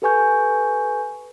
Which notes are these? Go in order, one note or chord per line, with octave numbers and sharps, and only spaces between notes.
G4 A4 B4 G#5 C#6 G6